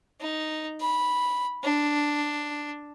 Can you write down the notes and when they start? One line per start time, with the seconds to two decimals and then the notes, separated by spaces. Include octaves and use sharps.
0.21 D#4
0.81 B5
1.64 D4